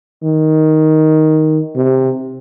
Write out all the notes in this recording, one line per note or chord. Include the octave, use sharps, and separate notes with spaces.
D#3
C3